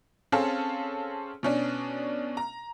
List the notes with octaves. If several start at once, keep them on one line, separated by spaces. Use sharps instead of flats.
C4 C#4 G#4 A4 F5 A5
B2 C#4 D4
A#5